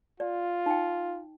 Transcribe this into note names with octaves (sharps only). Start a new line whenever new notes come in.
F4 D5
D#4 G5